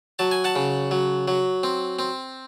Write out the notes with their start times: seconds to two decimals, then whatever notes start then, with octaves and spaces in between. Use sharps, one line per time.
0.19 F#3 A5
0.31 G#5
0.44 F#5 A5
0.56 C#3
0.91 F#3
1.28 F#3
1.63 C4
1.99 C4